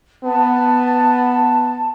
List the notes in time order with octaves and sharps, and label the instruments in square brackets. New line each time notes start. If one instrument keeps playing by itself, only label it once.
[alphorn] B3 [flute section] A5